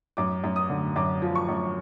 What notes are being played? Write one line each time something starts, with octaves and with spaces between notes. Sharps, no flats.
F#2 D6
F#2
D#6
D3
F#2 D6
F3
C#6
F#2